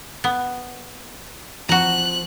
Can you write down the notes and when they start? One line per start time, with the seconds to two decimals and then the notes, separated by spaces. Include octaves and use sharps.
0.24 B3
1.69 F3 C4 F#4 A#5 F#6